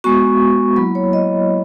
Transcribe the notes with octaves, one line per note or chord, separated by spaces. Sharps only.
G#3 B3 F#4 C#6
F#3 A#3 E4 B5
C#5
D#5